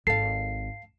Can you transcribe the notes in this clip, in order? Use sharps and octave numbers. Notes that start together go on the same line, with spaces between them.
G#1 A4 F5 C7